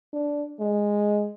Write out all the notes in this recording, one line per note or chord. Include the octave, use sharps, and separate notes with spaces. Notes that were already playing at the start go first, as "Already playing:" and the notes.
D4
G#3